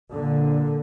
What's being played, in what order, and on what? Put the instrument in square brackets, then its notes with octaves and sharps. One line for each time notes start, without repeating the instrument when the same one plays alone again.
[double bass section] A#2 D3